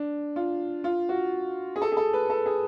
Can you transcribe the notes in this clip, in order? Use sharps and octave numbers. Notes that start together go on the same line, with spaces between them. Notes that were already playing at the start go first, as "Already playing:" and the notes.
Already playing: D4
F4
F4
F#4
G#4
A4
G#4
A4
B4
A4
G#4